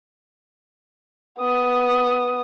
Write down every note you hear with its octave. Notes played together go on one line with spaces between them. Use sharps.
B3 D#6